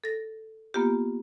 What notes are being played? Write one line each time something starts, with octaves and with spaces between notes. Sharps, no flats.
A4 A#6
A#3 B3 F4 G4